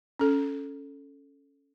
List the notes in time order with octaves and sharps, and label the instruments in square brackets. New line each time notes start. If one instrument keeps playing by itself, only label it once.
[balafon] C#4 A4